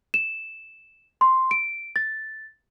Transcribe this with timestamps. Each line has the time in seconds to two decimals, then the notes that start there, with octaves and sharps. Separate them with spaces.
0.14 E7
1.21 C6
1.51 D7
1.96 A6